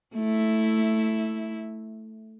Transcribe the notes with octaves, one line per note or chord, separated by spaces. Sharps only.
A3 E4